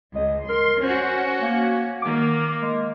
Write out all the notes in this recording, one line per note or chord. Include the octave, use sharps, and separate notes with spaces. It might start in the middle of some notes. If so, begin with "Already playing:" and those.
C#2 D#5
A#4 C6
C#4 F#4 C5
A#3
D#3 A#3 D6
G#3